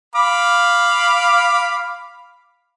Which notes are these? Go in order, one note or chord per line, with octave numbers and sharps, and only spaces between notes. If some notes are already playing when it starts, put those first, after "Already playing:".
F5 B5 D6